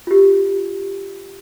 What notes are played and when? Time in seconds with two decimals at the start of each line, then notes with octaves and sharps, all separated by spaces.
0.07 F4 G4